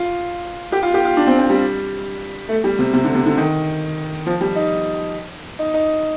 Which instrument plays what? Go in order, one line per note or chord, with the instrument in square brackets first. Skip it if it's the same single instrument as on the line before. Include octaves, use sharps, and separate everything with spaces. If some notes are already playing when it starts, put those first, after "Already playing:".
Already playing: [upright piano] F4
G4
F4
G4
F4
D4
C4
C4
G3
A3
G3
C3
C3
D3
C3
D3
D#3
F3
G3
D#4
D#4
D#4